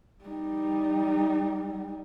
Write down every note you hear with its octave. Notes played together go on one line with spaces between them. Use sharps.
G3 D#4